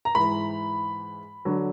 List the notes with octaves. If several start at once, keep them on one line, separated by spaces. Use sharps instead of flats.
A#5
G#2 E3 B5
D3 F#3